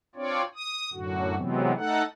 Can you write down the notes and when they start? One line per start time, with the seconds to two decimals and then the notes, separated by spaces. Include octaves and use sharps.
0.15 C4 D4 F4 C#5 D5
0.55 D#6
0.93 F#2 A2 D3 F#4
1.36 C3 E3 F#3 G#3 B3 C4
1.76 A3 D#4 A4 F#5